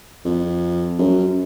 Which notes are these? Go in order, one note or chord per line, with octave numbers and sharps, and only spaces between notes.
F2
F#2